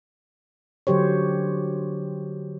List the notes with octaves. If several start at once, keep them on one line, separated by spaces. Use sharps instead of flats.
D3 F#3 G4 C5 C#5